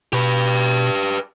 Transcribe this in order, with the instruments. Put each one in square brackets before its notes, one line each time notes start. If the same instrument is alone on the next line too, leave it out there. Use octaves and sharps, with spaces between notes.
[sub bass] B2 [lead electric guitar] G4 B4